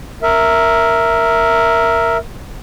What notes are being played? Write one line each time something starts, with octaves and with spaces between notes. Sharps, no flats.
A#4 E5